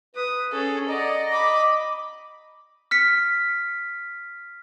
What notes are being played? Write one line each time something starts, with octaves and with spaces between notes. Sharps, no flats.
B4 D#6
C#4 G#4 A4
D5 D#5 F#5 A#5
B5 D6
F6 B6 C#7